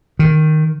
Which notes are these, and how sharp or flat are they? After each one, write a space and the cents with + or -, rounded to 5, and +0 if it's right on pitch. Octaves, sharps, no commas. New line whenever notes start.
D#3 -5